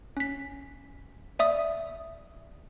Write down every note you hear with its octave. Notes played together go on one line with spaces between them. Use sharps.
C#4 B6
D5 E5 D#6